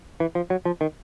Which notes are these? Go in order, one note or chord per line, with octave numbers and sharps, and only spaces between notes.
E3
F3
F#3
F3
D#3